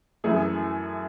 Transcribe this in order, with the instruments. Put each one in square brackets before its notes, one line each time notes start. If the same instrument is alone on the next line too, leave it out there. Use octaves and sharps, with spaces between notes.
[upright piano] F#2 E3 A3 E4 G#4